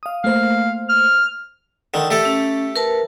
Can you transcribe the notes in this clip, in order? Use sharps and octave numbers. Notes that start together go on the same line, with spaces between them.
F5 D#6
A3 A#3 C5 F5
F6
D3 D#3
A3 G4 A4
C#4
A#4 B4 A5